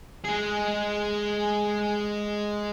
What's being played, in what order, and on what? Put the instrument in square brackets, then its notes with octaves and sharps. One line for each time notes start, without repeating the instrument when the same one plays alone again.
[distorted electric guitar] G#3 G#4